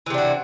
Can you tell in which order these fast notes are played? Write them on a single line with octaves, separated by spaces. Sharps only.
E3 C3 D4 F#4